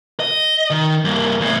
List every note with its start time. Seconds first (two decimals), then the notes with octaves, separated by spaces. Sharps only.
0.20 D#5
0.71 D#3
1.05 G2 A#3
1.40 E2 A2